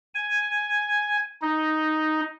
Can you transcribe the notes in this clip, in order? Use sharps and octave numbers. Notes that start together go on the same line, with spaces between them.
G#5
D#4